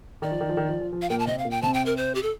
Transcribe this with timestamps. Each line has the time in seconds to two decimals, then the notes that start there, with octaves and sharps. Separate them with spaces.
0.22 D#3 D5
0.31 F3
0.40 D#3
0.49 F3
0.57 D#3
0.69 F3
0.81 F3
0.93 F3
1.02 F5
1.10 A#2 A#3 G5
1.19 A5
1.27 C3 C4 D#5
1.39 F5
1.45 A#2 A#3
1.51 G5
1.62 C3 C4 A5
1.74 G5
1.86 A#4
1.97 C5
2.15 G4
2.23 A4